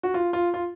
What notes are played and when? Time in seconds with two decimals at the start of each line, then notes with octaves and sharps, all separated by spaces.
0.03 F#4
0.14 F4
0.33 F4
0.54 F4